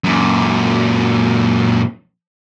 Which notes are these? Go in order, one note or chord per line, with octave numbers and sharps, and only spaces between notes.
F#2 A#2